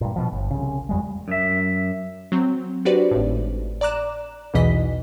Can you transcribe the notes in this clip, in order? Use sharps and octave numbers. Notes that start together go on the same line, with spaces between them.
G2 A#2
B2 F3
G1
C2 C#3
F2 G3 G#3
F#2 E5
F#3 C4
D4 F#4 G4 B4 C5 D5
G#1 A2
D5 A#5 D6 F#6 E7
B1 E2 B2 E3 D#5 B6